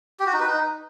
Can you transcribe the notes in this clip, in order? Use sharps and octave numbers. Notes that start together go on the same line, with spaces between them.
G4
F#4
D#4
B4
D#4